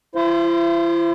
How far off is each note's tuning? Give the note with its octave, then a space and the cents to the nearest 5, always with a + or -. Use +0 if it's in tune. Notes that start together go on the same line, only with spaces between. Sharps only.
E4 +45 C5 +0 E5 +40